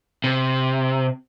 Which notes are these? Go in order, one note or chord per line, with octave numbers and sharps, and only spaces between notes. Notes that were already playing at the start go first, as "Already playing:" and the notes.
C3